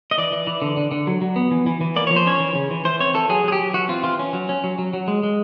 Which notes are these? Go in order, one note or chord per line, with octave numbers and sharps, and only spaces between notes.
D#5
E3 D5
E3
E3
D3
D3
D3
F#3
F#3
B3
E3
E3
E3
A#3 D5
F3 C#5
C5
C#4 C#5
E3
C#3
E3
E3 C5
C4 C#5
E3 A4
F#3 G#4
F#3 G#4
G4
F#3
E3 F#4
C4 F4
E3 F4
C#4
F#3
C#4
F#3
F#3
F#3
G#3
G#3